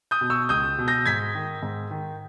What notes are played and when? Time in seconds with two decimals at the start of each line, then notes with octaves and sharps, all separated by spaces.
0.11 D#6 G6
0.21 B2
0.30 C#6 E6
0.49 C#2 D#6 G6
0.78 B2
0.88 G6 A#6
1.05 G#2 G#6 B6
1.35 D#3
1.63 G#2
1.91 D#3